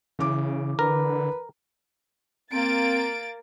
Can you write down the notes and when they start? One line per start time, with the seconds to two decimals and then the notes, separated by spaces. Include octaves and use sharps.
0.19 C#3 E3 D6
0.79 D3 A#4 B4
2.53 A#3 C4 A6 D7